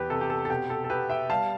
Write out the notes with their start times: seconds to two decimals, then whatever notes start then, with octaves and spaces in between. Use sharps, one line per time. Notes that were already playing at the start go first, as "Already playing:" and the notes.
Already playing: E2 G4 B4
0.10 C3 A4
0.21 G4
0.30 A4
0.45 A4
0.50 B2 G4
0.70 A4
0.84 A4
0.90 B3 G4 B4
1.09 E5 G5
1.30 G3 F5 A5